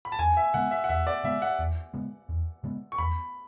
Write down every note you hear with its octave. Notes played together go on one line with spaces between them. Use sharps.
B5
A5
E2 G#5
E5
C#3 G#3 B3 F#5
E5
F#5
E2 E5
D5
C#3 G#3 B3 E5
F#5
E2
C#3 G#3 B3
E2
C#3 G#3 B3
C#6
E2 B5